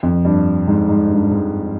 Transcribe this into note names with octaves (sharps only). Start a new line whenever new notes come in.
F2
G2
G#2
G#2
G2
G#2